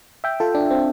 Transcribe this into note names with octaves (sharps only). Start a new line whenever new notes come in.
E5 G5
F4 A4
D4
C4